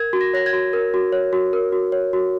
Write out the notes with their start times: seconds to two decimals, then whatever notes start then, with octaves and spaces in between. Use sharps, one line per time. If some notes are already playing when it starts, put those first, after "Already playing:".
Already playing: A#4 G#6
0.13 F#4
0.21 A#6
0.34 C#5 A#6
0.46 G#6
0.53 F#4
0.73 A#4
0.94 F#4
1.12 C#5
1.33 F#4
1.53 A#4
1.72 F#4
1.92 C#5
2.13 F#4